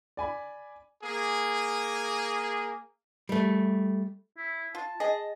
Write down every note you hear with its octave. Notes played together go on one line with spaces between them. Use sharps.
D5 G#5 B5
A#3 G#4
G3 A3
E4
F4 A5
G#4 D#5